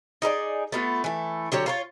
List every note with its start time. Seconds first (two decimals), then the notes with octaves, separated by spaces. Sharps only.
0.22 D#4 G#4 B4 D5
0.72 A3 B3 F4
1.04 E3 A3
1.52 D3 F#3 G4 C#5
1.66 F4 A#4 C#5